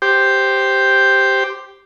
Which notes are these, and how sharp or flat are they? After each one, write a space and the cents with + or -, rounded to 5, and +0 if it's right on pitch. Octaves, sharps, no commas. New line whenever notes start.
G4 +0 C5 +0